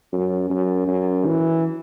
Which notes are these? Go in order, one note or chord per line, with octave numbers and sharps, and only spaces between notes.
F#2
F#2
F#2
E3